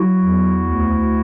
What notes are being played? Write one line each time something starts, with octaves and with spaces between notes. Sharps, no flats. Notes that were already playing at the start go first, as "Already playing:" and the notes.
Already playing: F#3 E4 F#4
E2
D2